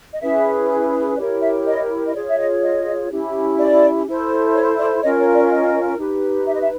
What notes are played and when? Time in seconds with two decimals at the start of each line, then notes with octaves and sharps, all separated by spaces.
0.13 D#5
0.21 C#4 E4 G#4 B4 E5
1.17 E4 G4 A#4 C#5 D5
1.41 E5
1.66 D#5
2.05 D#5
2.13 F4 G#4 C#5 D5
2.28 E5
2.38 D#5
2.62 D#5
3.10 C#4 E4 G4
3.58 D5
4.07 E4 A4 C5
4.55 C#5
4.78 D5
5.02 C#4 F4 A#4 C#5 D#5
5.19 C#5
5.34 D5
5.50 D#5
5.98 D#4 G4 B4
6.47 E5
6.55 D#5
6.62 E5